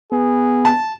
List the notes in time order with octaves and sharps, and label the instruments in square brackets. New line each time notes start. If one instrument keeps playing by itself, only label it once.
[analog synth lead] B3 [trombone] G#4
[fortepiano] A5